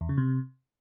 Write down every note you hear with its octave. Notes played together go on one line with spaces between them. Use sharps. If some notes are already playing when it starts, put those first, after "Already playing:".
E2
C#3
C3